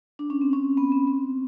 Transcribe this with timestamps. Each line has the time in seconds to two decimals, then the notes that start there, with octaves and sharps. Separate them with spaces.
0.19 D4
0.30 C#4
0.41 C4
0.53 C#4
0.77 B3
0.92 C4
1.07 C4